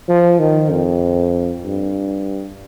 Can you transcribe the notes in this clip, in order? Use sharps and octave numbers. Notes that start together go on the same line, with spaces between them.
F3
D#3
F2
G2